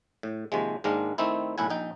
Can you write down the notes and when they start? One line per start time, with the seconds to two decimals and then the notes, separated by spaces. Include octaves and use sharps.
0.23 A2
0.52 D#2 C3 F3 G#3
0.84 G#2 D#3 G#3 A#3 D4 A#4
1.18 D#3 A3 C4 D#4 E4
1.58 B1 A2 E4 F#5 G#5
1.70 A#1 D#4 G5